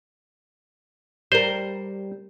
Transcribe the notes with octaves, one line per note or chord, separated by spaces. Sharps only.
G3 A#4 C5